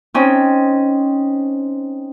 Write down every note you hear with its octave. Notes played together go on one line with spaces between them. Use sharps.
C4 C#4 D#4